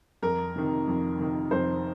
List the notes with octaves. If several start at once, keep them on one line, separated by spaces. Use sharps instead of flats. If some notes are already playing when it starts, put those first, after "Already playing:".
F2 A#4
C3 D#3
F2
C3 D#3
F2 C5